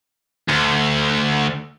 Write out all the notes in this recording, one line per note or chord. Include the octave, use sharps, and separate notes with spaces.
D2